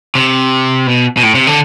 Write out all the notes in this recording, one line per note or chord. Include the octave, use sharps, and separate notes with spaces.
C3
B2
B2
A2
C3
D3